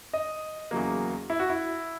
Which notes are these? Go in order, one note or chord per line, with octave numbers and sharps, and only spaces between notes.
D#5
E2 C#3 F#3 A#3
E4
F#4
E4